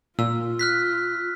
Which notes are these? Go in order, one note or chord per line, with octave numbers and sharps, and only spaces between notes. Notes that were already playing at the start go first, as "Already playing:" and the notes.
A#2 F4 E6
F6 F#6 B6